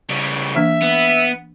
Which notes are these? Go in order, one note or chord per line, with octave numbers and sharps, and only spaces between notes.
C#3 G3
E3 A#3 D4 E5
B3